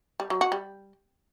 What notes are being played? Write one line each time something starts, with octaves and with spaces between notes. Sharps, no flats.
G3
F#3
F#4
G3